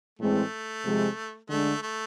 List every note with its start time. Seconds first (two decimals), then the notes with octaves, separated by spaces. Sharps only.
0.18 A2 E3 G#3 A3 C4
0.85 C3 F3 G#3
1.49 D3 G#3 A3 D4
1.82 A3